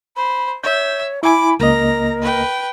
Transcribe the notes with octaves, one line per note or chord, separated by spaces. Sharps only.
C5 B5
C#5 E5 G6
E4 G#5 B5 D6
C#2 A#3 A#4 D#5 A#5
B4 G5